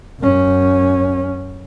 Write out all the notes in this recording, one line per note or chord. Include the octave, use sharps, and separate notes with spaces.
F#2 C#4